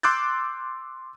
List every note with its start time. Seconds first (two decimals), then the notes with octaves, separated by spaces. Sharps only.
0.03 C6 D6 E6 F#6 G6 A6